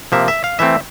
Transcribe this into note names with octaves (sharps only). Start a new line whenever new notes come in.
C3 F3 A#3 E5
E5
F5
E3 A3 C4 E5